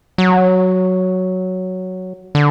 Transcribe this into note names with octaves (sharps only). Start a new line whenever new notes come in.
F#3
D3